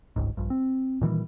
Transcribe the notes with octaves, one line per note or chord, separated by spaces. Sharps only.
G1 C#2 G#2
A#1 G2
C4
A#2 D#3 E3 G3